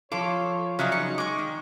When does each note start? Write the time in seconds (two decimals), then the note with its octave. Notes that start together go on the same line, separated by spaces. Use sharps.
0.12 F3 F4 A4 C#5 D6
0.79 C#3 F#3 D#4 E4 F5
0.92 D#4 C#6
1.18 G#3 C#6 D6
1.39 D#3